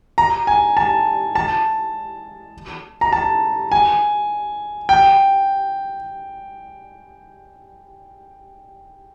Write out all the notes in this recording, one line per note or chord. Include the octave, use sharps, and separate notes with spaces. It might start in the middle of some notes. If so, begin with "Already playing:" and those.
A#5
G#5
A5
A5
A#5
A5
G#5
G5